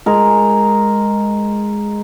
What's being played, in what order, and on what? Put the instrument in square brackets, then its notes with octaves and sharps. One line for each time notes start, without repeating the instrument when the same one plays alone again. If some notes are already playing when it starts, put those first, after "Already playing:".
[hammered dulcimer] G#3 A#4